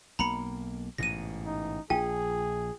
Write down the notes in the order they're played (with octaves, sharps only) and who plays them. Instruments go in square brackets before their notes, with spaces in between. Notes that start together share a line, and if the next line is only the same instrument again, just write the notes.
[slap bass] B1 A#3 [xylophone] A#5 B5 C#7
[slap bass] A1 G#2 B2 [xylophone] A#6 D#7
[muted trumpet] D#4
[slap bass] A#1 [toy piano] F4 G5 [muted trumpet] G#4 [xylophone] G#5